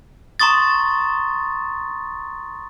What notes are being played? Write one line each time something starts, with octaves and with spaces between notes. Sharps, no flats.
A#5 C6 C#6 D#6 A6